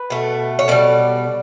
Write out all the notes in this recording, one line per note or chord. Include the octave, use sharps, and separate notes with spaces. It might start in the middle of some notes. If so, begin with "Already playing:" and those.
Already playing: B4
B2 A3
C#5
B2 G3 D5